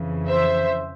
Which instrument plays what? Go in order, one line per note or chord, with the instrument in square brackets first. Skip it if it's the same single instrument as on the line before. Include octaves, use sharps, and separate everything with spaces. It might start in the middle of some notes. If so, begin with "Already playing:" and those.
Already playing: [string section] F2 C#3 E3
C5 E5